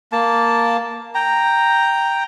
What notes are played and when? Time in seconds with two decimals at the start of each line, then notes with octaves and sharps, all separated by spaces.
0.12 A#3 A5
1.15 G5 A#5